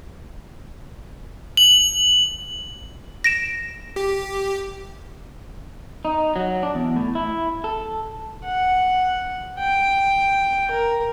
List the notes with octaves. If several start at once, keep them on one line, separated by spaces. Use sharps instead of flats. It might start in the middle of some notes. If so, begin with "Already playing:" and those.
F#7
A#6 D7 E7
G4
D#4
F#3
D4
E2
A2
E4
A4
F#5
G5
A#4